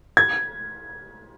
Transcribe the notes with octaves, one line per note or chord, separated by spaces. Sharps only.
G#6